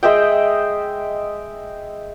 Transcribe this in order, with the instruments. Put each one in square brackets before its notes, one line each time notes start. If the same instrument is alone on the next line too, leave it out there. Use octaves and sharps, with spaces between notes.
[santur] G#3 D#5 E5 G5